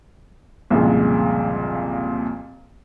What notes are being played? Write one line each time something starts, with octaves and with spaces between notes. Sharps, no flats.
C2 F2 A#2 C#3 G#3